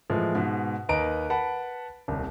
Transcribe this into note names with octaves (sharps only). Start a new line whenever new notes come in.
A2 E3 F3 G#3
G#2 B2
D#2 B4 D#5 A#5 D7
B4 F#5 A5 B5
D#1 C2